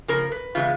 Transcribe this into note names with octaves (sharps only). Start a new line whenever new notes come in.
C#3 F3 A#3 A#4
B4
C#3 E3 G#3 B3 F4